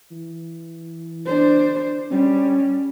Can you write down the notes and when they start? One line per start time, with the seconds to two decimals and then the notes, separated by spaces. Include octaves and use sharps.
0.12 E3
1.26 D4 C5
2.11 G3 C#4